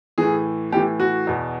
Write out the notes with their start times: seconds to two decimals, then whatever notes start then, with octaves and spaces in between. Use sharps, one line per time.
0.18 A2 E3 G#4
0.72 A2 G4
0.76 E3
1.00 F#4
1.27 E2 B2